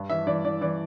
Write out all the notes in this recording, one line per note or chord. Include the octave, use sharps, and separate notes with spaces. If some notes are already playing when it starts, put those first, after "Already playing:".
Already playing: G2
E3 E5
E3 D5
E3 D5
E3 D5